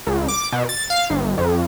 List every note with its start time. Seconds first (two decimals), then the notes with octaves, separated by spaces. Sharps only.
0.07 C#2
0.28 D6
0.52 B2
0.69 A6
0.90 F5
1.10 G1
1.38 F2